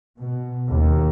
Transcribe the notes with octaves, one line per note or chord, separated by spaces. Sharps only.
B2
D#2